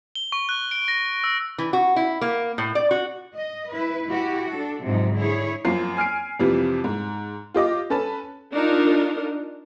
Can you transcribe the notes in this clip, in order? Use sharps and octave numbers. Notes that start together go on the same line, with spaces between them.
G7
C#6
F#6
D7
A#6
E6
E3
F#4
E4
A#3
A2
D5
F#4
D#5
E4 B4
E4 F#4 G4
D4 A4
G#2 C3 F3 F#3 D#4
D3 E4 G#4 C#5
F#2 F3 A#3 C7
G#5 F6 C7 D7
F2 C3 E3 F3 G3
G#2
F4 G4 D#5 D6
C#4 A4 B4 A5
D4 D#4 F4 A#4